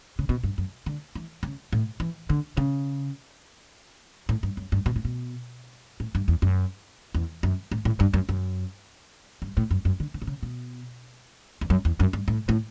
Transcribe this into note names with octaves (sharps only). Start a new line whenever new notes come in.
C#3
B2
G2
F#2
D3
E3
C#3
A2
E3
D3
C#3
A2
G2
F#2
G2
B2
A2
B2
A2
G2
E2
F#2
E2
F#2
A2
A2
G2
F#2
F#2
G2
A2
F#2
F#2
D3
D3
B2
C#3
B2
E2
F#2
E2
F#2
G2
A2
A2